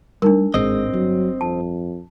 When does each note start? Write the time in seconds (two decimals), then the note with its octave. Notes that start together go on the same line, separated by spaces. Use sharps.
0.22 G3 A3 D4 D#4 A#4
0.54 G#1 A2 G#3 C4 D#5
0.93 G1 F#3
1.41 F2 A5